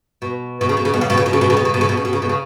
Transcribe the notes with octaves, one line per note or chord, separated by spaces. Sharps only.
B2
B2
C#3
B2
C#3
B2
C#3
B2
C#3
B2
C#3
B2
C#3
B2
C#3
B2
C#3
B2
C#3
B2
C#3
B2
C#3